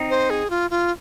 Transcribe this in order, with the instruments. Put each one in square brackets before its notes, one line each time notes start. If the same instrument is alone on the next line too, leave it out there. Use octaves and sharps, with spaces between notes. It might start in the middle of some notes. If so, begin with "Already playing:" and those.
Already playing: [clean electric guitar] C4 D#4
[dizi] C5
G#4
F4
F4